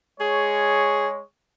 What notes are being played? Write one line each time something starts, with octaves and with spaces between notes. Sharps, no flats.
G#3 G#4 C#5